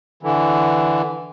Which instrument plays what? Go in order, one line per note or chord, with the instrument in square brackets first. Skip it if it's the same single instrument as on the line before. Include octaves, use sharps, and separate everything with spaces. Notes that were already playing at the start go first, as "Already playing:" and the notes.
[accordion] D3 E3